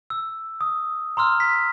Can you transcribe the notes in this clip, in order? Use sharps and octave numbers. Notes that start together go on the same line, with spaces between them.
E6
D#6
A#5 C6 E6 F6
B6